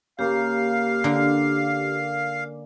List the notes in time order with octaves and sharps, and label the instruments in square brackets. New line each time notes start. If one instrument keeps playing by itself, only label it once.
[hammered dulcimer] C#3 A#3 [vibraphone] G4 [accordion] F5
[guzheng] D3 A#4 [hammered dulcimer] D5